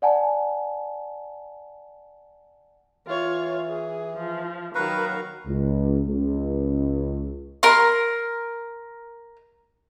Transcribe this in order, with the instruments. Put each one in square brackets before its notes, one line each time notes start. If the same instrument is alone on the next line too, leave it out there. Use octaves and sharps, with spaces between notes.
[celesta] D5 F#5 G#5 A5
[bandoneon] E3 [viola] F4 C#5
[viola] G#4
F3
[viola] D#3 F#3 [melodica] B4 [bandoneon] F5 A#5 C#6
[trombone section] C#2
C#2
[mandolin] A#4 C6